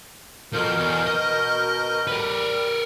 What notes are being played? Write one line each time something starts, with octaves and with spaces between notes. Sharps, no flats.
B2 F3 A4 A#4 G6
E2
D#5
G3 A#4 B4